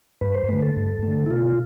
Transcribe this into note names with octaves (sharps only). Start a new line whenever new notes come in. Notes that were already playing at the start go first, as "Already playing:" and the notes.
G2 B4
C5
D3 A3 B4
A4
G2
D3 A3
E4
B2 F4